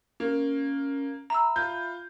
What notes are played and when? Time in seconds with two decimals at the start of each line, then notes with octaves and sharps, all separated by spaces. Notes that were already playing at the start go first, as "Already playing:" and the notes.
0.20 A#3 C#4
1.30 E5 A#5 B5 E6
1.56 F4 G6